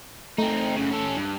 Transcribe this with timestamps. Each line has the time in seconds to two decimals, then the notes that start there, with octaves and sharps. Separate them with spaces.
0.38 A3 C4 D#4
0.76 F#2 C#3
0.91 C#4 A4
1.16 G2